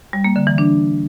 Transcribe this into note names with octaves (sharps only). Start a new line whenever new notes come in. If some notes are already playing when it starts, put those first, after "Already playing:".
G3
A#3
D3
E3
D4